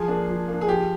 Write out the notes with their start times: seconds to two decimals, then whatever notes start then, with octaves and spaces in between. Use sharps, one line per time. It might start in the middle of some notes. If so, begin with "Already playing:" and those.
Already playing: F3 G#4
0.08 A#3 D4
0.29 F3
0.48 A#3 D4
0.61 G#4
0.68 F3 G4